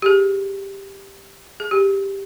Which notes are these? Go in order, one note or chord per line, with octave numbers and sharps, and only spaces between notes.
G4
G#4
G#4
G4